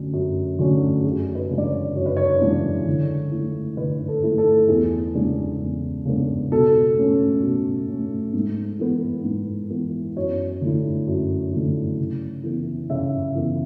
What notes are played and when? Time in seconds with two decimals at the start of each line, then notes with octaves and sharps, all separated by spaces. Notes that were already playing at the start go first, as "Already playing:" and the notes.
Already playing: F#2 D3 F#3 A3 C#4
0.14 F#2
0.59 D3 F#3 A3 C#4
1.04 F#2 G#4
1.35 B4
1.50 C#3 E3 G#3 D4
1.58 D5
1.65 C#5
1.96 F#2 C#5
2.06 B4
2.17 C#5
2.41 C#3 E3 G#3 D4
2.87 D3
3.32 A3 E4
3.77 D3 B4
4.08 A4
4.23 A3 E4
4.38 A4
4.68 E2 G#4
5.14 C#3 G#3 B3 D4
5.60 E2
6.05 C#3 G#3 B3 D4
6.52 B2 A4
6.97 A3 C#4
7.42 B2
7.88 A3 C#4
8.34 G#2
8.79 E3 B3
9.24 G#2
9.70 E3 B3
10.16 F#2 C#5
10.61 D3 A3 E4
11.08 F#2
11.52 D3 A3 E4
11.98 C#3
12.44 E3 B3
12.90 C#3 E5
13.35 E3 B3